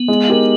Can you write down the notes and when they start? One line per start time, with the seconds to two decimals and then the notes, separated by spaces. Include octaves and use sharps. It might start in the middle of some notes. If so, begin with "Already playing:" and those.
Already playing: B3
0.08 G#3
0.28 D#4 G4 A#4